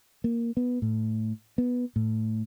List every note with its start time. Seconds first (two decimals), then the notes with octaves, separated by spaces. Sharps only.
0.24 A#3
0.57 B3
0.82 A2
1.58 B3
1.96 A2